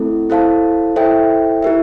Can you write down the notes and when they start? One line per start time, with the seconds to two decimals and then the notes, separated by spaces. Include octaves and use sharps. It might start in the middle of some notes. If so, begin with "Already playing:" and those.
Already playing: A3 C4 E4 A4
0.30 E4 A4 C5 F5 A5
0.96 E4 A4 C5 E5 G5
1.62 E4 G4 A#4 E5